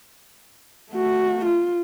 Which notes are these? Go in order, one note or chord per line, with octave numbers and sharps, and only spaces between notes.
A3 F#4
F4